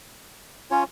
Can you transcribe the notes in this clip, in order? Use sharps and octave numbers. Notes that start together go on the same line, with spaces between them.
C#4 F4 C#5 G#5